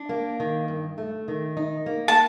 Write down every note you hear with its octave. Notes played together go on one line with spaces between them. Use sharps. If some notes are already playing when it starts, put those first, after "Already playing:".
Already playing: D4
A#3
D#3
G2
A3
D#3
D#4
A#3
A5